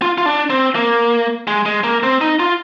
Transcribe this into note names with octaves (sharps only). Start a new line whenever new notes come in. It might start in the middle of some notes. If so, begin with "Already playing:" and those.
F4
F4
D4
C4
A#3
G#3
G#3
A#3
C4
D#4
F4